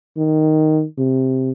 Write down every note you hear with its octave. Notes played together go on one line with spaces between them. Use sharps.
D#3
C3